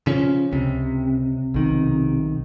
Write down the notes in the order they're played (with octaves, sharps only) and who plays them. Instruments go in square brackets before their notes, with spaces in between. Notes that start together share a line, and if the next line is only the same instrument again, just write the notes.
[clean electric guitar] C#3 F3 C#4
[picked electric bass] C#2 [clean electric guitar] C3
[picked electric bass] B1 D#3